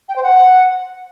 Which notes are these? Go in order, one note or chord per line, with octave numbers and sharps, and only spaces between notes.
G5
C5
F#5